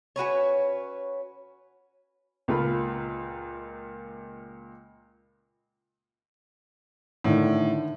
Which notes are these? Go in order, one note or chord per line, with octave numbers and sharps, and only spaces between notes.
C#4 F#4 B4 C#5
C#2 A#2 F4 A#4 B5
A2 D3 D#3